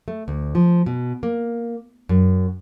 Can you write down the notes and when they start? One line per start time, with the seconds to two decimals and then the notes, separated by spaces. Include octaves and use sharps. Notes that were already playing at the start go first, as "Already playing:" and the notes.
0.08 A3
0.28 D2
0.55 F3
0.86 B2
1.23 A#3
2.09 F#2